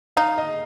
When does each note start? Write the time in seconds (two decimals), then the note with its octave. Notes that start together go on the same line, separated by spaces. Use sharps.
0.17 D#4 F5
0.38 D#5